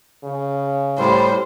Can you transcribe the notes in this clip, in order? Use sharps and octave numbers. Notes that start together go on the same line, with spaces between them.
C#3
A2 G3 C5